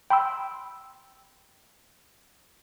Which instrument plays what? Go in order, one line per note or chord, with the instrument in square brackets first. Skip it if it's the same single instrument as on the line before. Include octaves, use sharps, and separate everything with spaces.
[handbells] G5 B5 C6 E6